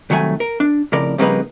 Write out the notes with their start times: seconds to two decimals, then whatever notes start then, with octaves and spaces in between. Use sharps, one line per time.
0.10 C2 D#3 F#3 A3 G#5
0.40 A#4
0.60 D4
0.93 F2 A2 C#3 A#4 D5
1.18 F2 C#3 G3 A#3 D#4 B4